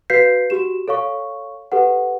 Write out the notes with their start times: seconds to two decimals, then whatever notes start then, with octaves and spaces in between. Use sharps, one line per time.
0.10 F#4 B4 F5 G6 B6 C7
0.50 F#4 G4 E7
0.88 A4 C#5 F5 C#6
1.72 G4 A4 B4 F#5